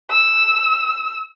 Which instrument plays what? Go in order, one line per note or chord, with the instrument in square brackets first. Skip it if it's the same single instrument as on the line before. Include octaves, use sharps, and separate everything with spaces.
[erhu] E6